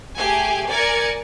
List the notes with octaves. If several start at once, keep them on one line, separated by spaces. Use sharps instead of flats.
A3 G4 G#4 G#5
A#4 D5 G#5 G#6 C#7